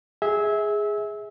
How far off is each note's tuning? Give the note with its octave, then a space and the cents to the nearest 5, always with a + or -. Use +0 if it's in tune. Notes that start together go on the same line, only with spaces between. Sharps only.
G#4 +0 E5 -25